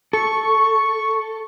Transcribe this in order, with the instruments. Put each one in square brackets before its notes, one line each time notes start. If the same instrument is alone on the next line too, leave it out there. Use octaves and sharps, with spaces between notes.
[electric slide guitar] A4 [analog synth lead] C#6